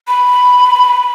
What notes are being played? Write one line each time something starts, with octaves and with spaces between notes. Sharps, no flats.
B5